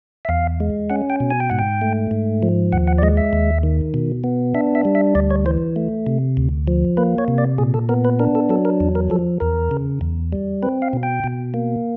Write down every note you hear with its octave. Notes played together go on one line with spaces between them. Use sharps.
E5
E2 F5
G#3
C#4 F#5
G5
B2
G#5
G5
G#2 F#5
G5
A3
G#2
F3
D#2 F#5
F#5
D5
G#3 D#5
E5
D#2
D#3
B2
B3
D4 E5
E5
G3
E5
D2 D5
C#5
E3 C5
A3
C3
D2
F3
A#3 B4
C#5
C3
D5
A#2 G#4
A4
B3 A#4
B4
D4 A#4
A4
F#3 A4
A#4
E2
A#4
F3 A4
E2 A#4
C#3
E2
G3
C4 B4
F5
B2
G5
B2
A#3